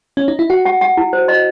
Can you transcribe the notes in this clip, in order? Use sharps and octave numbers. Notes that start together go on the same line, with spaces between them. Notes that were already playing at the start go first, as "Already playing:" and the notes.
C#4
D#4
E4
F#4 F#5
F#5
F#5
E4
C5
D#5